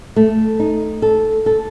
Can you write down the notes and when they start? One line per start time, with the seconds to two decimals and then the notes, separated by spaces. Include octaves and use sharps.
0.16 A3
0.60 D#4
1.02 A4
1.46 A4